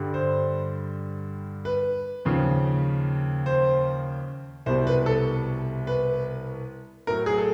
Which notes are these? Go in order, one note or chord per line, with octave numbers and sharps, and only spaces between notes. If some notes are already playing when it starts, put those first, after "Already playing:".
Already playing: G2 D3 G3
C5
B4
D#2 C#3 F3
C5
C2 B2 G3 C5
B4
A4
B4
A2 F#3 A#4
G#4
A4